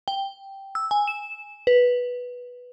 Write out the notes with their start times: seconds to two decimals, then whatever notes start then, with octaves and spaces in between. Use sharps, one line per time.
0.08 G5
0.75 E6
0.91 G#5
1.08 E7
1.67 B4